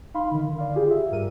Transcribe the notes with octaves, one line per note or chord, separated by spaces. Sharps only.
D#4 F5 B5 C6
D3 D#3
D5 F5
F4 G4 G#4
E5
G2 A#4 D#7